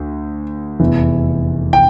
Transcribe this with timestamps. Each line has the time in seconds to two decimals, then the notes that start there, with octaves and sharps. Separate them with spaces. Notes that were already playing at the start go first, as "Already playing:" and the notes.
Already playing: D2
0.80 F1 E2 E3
1.73 G5